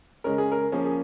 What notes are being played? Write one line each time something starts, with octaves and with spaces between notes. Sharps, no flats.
C#3 G#3 C#4 A#4
G#4
A#4
F3 A#3 C#4 G#4
G#4